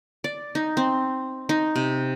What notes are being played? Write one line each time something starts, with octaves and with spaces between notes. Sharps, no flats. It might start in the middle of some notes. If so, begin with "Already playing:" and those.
D5
D#4
C4
D#4
C3